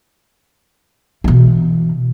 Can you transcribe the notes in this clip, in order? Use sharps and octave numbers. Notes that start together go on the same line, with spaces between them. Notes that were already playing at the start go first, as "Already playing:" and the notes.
B2 E3